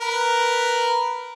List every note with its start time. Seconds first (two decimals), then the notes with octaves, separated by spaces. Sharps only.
0.01 A#4 B4